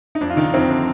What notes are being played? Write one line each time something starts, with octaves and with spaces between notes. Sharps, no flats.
D#4
F2 D4
F4
D3 D#3 D#4
F2 C4
D3